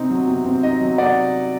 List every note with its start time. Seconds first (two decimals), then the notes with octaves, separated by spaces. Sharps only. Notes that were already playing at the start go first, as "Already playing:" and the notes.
Already playing: C3 C4 D#4
0.10 F#3
0.28 C3
0.45 C4
0.63 D#4 D#5
0.81 F#3
0.98 C3 D5 F#5